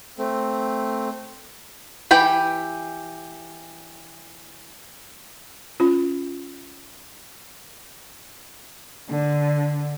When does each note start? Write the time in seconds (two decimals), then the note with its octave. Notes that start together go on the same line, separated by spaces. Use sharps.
0.18 A3 C4
2.11 E3 G4 G5 B5
5.80 C#4 F4
9.09 D3